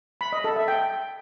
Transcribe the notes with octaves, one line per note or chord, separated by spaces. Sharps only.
B5
D#5
A4
E5
G5